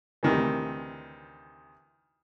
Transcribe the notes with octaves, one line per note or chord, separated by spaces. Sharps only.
D2 C3 D#3 E3